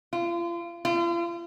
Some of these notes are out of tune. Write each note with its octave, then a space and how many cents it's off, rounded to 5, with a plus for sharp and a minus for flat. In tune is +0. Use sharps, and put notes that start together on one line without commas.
F4 -35
F4 -40